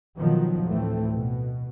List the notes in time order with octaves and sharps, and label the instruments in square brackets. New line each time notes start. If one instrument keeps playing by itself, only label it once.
[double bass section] B2 D#3 F3 F#3
D2 A2 E3 A3 C4
B2